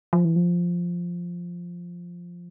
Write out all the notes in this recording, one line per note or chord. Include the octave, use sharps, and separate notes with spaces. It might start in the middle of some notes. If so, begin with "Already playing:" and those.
F3
E3
F3